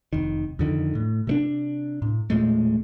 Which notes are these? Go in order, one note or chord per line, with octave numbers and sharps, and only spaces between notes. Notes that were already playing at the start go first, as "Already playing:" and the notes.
F1 D#3
F2 D3 D#3
A2
C3 A3 D4
A2
E1 A#2 G#3 A3